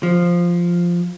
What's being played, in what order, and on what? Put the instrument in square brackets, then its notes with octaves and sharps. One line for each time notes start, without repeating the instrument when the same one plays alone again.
[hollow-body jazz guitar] F3